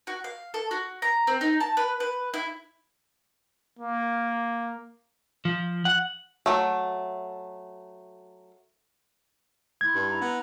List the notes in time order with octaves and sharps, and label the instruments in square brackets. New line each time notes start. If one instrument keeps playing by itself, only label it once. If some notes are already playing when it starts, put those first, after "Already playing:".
[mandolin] F#4
F5
A4
F#4
A#5
C4
D#4
A5
B4
B4
E4
[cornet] A#3
[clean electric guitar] F3
F#5
[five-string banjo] F#3 A3
[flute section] E4 C6 [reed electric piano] G#6
[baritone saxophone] G2
[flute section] E4 A#5
[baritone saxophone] B3